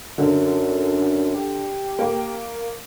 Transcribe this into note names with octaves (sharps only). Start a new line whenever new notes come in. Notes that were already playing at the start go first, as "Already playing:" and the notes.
F#2 D3
G4
A#3